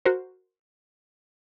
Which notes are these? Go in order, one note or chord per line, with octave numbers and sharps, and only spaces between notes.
F#4 A#4 C5